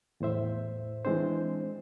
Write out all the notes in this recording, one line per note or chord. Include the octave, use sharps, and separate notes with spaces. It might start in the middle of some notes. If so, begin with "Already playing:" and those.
E2 A2 C5 E5
E3 G#3 C4 D4 C5